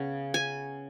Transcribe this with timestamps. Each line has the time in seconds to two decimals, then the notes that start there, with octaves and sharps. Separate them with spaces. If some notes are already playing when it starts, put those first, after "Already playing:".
Already playing: C#3 B3
0.34 G#5